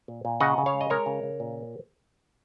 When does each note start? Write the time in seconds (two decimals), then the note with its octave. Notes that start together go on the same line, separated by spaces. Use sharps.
0.08 A#2
0.25 A#2
0.41 C#3 D#5 F#5
0.58 C#3
0.66 C#5 F5
0.74 G#3
0.81 D#5
0.90 G#3 A#4 C#5
1.06 C#3
1.23 C#3
1.40 A#2